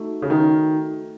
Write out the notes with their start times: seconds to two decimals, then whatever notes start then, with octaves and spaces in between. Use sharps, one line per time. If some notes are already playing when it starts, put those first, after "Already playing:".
Already playing: A3 D#4 F#4 A4
0.22 C#3
0.30 D#3